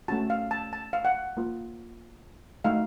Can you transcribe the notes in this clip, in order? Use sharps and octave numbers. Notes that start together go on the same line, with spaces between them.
A3 C#4 F#4 A5
F5
A5
A5
F5
F#5
A#3 F4
A3 D#4 F#4 F5